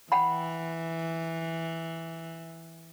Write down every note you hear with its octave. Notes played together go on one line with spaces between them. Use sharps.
E3 F#5 G5 B5